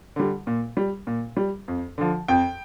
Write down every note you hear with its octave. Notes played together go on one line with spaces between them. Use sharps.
D3 G3
A#2
G3
A#2
G3
F2
D3 F3
F2 G5